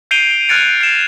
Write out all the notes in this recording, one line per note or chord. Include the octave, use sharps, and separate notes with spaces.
G6 C7 D7 D#7 F7 G7
F6 F#6 G#6 A6 C#7 D7
C7 E7